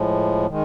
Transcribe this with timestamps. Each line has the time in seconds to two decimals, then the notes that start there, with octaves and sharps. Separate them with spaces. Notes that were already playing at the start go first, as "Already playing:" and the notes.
Already playing: A2 F3 G#3
0.48 D#3 G#3